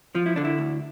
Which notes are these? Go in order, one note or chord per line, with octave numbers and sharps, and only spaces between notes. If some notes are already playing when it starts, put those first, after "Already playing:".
F3 F4
E4
D3 D4
E4
D2